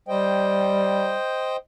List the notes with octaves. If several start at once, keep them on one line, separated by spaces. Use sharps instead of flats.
G3 C5 D#5 G5